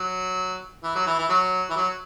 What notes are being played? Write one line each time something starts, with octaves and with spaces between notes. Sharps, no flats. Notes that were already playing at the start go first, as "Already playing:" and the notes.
Already playing: F#3
E3
F#3
E3
E3
F#3
E3
F#3